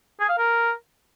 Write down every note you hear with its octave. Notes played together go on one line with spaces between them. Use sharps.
G#4
F5
A#4